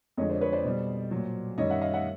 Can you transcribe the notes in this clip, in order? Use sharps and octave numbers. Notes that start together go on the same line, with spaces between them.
F2 D3 F3 G#3 C#5 D#5
C5 D5
B4 C#5
C5 D5
B2 G3
A#2 F#3
F#2 D#3 G3 C#5 D#5
E5 F#5
D#5 F5
E5 F#5